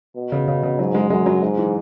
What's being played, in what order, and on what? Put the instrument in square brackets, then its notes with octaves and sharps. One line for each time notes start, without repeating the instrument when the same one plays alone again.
[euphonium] B2
[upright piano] C#3
C#3
C#3
[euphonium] G#2 [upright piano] F#3
[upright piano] G#3
[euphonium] F#2 [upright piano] G#3
[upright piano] F#3
[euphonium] G#2
[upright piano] E3